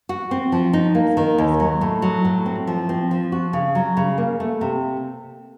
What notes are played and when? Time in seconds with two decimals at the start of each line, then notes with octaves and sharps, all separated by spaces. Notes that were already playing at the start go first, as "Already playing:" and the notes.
0.09 F#4
0.31 C4
0.52 F3
0.73 D#4
0.95 A#3
1.17 D#3
1.38 D#2
1.60 F#3
1.81 A2
2.02 F#3
2.25 A2
2.46 C4
2.67 F3
2.89 C4
3.11 F3
3.32 F#4
3.53 C#3
3.75 F#3
3.97 C#3
4.18 A#3
4.40 A3
4.61 C3